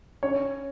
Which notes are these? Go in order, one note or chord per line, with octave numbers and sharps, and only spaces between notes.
C#4 C#5